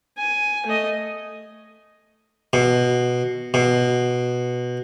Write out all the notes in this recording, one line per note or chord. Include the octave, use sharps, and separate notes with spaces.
G#5
A3 D#5
B2
B2